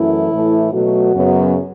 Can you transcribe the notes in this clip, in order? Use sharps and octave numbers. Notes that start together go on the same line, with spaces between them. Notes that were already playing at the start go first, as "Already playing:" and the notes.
Already playing: F#2 E3 A3 E4
A2 E3 A3
B2 F#3 A3 F#4
F#2 C#3 F#3 B3